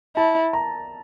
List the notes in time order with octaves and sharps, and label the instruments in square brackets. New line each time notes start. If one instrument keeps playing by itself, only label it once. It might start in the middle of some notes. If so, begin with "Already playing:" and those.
[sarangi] E4 [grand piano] A5
[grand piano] A#5